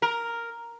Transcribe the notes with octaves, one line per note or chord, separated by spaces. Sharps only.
A#4